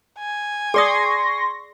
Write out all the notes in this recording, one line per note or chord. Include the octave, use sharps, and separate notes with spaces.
G#5
G#4 D5 C6 C#6 D#6 A#6